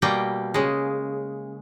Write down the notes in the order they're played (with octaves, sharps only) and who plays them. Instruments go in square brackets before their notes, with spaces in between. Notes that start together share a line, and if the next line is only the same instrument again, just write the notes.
[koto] B2 G3 A#3 G5
C#3 G#3